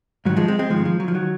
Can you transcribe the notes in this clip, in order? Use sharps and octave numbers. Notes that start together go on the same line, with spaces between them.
G#2 D#3 F#3
F3 G#3
G#3 C4
G#3 C4
G#2 D#3 F3 G#3
F3
F#3
F3
D#3 F#3